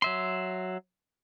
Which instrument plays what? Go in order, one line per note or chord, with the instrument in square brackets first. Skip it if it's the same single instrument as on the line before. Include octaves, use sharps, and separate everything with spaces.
[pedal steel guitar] F#3 E5 C6